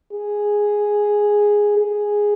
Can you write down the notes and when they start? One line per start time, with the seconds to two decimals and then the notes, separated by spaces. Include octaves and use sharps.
0.13 G#4
1.77 G#4